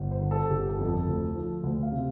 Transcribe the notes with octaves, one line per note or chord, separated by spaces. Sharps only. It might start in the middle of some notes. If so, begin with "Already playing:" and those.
Already playing: G1
C5
D3
A4
G1 G4
A4
F2
A4
D2
F3
D2
F5
C3